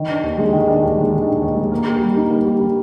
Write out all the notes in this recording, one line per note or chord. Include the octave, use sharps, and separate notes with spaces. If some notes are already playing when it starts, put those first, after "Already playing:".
Already playing: D#3
D4
D#2
G#3
D#3
D4
D#2
G#3
D#3
D4
D#2
G#3
A#3
G4
G3
D#4
A#3
G4
G3